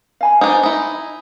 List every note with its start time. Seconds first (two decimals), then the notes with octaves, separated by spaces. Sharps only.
0.21 F5 G#5 B5
0.41 D4 D#4 C5 G#5
0.63 D#4 E4